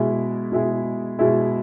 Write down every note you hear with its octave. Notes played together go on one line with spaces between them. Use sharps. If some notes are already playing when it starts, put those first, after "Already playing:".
Already playing: B2 G#3 E4 G#4
B2 G#3 E4 G#4
B2 G#3 E4 G#4